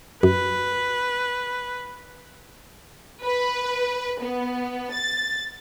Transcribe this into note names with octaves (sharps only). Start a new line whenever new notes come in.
F#2 B4
B4
B3
A6